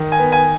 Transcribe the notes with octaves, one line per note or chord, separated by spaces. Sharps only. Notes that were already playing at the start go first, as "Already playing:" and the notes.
Already playing: D#3
G#5
B3
G#5